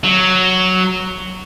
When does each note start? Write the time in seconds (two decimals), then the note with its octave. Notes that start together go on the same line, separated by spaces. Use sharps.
0.04 F#3